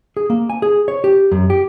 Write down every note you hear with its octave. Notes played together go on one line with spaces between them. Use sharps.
G#4
A#3
G#5
G#4
C#5
G4
F#2
G4